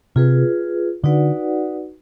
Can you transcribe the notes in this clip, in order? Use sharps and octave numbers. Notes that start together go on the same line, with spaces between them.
C3 F4 G#4 B4
D3 D#4 F#4 B4 D5 F#5